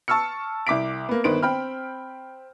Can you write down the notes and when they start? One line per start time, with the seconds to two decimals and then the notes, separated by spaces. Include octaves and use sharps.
0.08 A5 C#6 E6 F6 C#7
0.67 C2 D6 B6 D7
1.09 A#3 B3
1.24 G1 D#3 B3 C5 D7
1.43 C4 G5 B5 F6